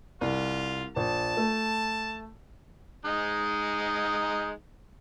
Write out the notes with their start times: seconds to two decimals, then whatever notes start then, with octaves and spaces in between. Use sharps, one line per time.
0.21 C2 F4
0.96 A#1 A5
1.37 A3
3.05 G#3 D#4